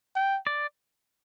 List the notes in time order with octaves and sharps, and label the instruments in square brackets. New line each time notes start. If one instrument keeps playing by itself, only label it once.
[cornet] G5
[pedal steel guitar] D5